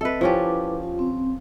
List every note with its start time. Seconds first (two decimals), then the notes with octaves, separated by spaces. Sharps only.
0.01 C4 A4 B4 D#5 E5
0.21 F3 C#4 E4 G4 B4 D6
0.83 F4
0.99 C4